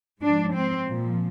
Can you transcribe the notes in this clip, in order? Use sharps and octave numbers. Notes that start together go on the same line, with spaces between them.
G#2 F3 D4
C4
A#2 F3